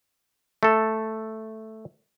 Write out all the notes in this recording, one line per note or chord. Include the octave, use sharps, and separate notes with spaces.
A3 A4